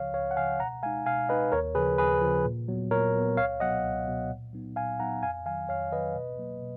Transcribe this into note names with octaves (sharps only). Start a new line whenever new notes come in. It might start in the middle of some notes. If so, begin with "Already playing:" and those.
Already playing: C#2 C#3 F3 C#5 F5
C#2 C#5 F5
F#5
C#3 F3 F5 G#5
B2 F#5 A#5
G#3 D#4 F5 G#5
B2 F5 G#5
G#3 D#4 B4 D#5
D#2 A#4 C#5
C#3 F3 G#4 B4
D#2 G#4 B4
C#3 F3
A#2
F#3 B3
A#2 A#4 C#5
F#3 B3
C#2 C#5 F5
B2 F#3 B3 D#5 F#5
C#2
B2 F#3 B3
A#2
F#3 B3 D#4
A#2 F5 G#5
F#3 B3 D#4 F#5 A#5
F2 F5 G#5
D#3 F#3 F5 G#5
F2 C#5 F5
D#3 F#3 B4 D#5
B2
F#3 A#3
B2